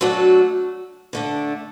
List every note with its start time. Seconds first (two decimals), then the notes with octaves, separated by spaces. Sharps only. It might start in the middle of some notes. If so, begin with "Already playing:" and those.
0.01 F#3 A3 D4 F#4 A4
1.13 D3 A3 D4